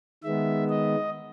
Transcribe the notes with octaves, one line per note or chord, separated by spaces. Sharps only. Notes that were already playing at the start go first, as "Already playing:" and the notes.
D#3 G#3 B3 E5
D#5